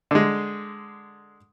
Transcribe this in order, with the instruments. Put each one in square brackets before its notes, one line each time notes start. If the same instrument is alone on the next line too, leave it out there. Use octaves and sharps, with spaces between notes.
[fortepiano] D3 G#3